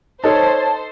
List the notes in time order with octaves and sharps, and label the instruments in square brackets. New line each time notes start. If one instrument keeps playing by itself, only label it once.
[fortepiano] D#4 A4 [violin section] C5 [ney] C#5 [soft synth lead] A5